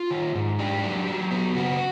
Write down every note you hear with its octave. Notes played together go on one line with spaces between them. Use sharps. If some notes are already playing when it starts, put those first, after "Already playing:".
Already playing: F4
D#3
G#2
D4 G4
F#3
F#3
B3
C#3 F#4